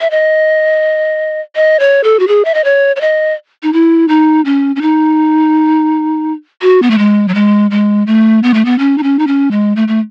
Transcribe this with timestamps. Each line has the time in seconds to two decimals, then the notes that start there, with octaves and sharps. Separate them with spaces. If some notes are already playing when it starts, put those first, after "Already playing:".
0.01 E5
0.11 D#5
1.56 D#5
1.80 C#5
2.04 A4
2.19 F#4
2.28 G#4
2.45 E5
2.54 D#5
2.64 C#5
2.96 C#5
3.01 D#5
3.63 D#4
3.73 E4
4.08 D#4
4.45 C#4
4.76 C#4
4.82 D#4
6.62 F#4
6.82 B3
6.90 A3
6.98 G#3
7.28 F#3
7.35 G#3
7.71 G#3
8.07 A3
8.43 B3
8.54 A3
8.65 B3
8.79 C#4
8.98 D#4
9.03 C#4
9.19 D#4
9.27 C#4
9.51 G#3
9.76 A3
9.88 A3